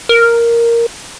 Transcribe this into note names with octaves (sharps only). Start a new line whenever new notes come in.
A#4